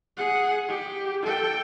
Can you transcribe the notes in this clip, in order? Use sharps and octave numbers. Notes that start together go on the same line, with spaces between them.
G#4 F#5
G4
A4 G5